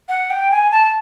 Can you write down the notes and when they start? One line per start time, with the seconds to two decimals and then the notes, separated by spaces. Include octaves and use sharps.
0.09 F#5
0.30 G5
0.51 G#5
0.72 A5